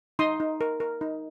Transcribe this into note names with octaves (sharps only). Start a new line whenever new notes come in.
D#4 C6 D#6
D#4
A#4
A#4
D#4